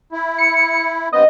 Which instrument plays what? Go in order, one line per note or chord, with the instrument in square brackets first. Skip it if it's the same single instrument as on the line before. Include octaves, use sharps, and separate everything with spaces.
[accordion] E4
[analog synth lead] C#7
[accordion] G2 B3 C4 [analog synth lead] D#5